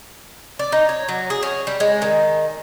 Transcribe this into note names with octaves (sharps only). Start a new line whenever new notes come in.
D5
D#4
C#5
F#3
G#4
C#4
G3
G#3
D#3